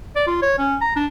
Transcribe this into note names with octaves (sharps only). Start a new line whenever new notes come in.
D5
F4
C#5
C#4
A#5
D4